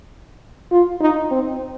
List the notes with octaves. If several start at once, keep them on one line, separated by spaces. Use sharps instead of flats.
F4
D#4
C4